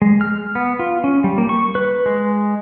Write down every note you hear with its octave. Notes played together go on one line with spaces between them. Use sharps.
G#3
F6
B3
F4
C#4
G3
A#3
C#6
B4
G#3